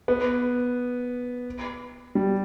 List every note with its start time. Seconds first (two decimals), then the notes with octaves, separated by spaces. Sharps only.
0.08 B3
2.15 G3